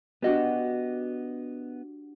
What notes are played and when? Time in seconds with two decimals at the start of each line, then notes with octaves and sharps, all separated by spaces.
0.22 B3 D4 F#4 G4 D#5